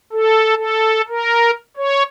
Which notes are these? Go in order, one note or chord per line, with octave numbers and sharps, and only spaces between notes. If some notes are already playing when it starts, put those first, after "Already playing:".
A4
A4
A#4
C#5